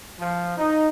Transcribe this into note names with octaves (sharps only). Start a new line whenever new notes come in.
F3
D#4